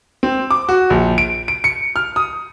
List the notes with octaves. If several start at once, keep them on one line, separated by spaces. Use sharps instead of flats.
C4
D6
F#4
A#1
D7
D7
C#7
F6
D#6